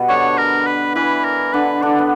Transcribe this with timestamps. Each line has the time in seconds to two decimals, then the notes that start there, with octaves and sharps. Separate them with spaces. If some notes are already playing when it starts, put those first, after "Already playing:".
Already playing: B2 G3 B3
0.09 D3 D4 C#5
0.38 A#4
0.67 B4
0.95 E3 E4 B4
1.25 A#4
1.54 D3 D4 B4
1.82 D3 D4 D5
1.99 B3